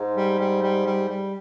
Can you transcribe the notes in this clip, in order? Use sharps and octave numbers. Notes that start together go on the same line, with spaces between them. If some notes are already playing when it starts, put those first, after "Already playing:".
Already playing: G#2
G3
G3
G3
G3
G3